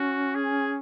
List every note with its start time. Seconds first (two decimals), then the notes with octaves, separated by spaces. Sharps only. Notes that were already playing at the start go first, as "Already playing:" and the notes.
Already playing: C#4 F#4
0.35 G#4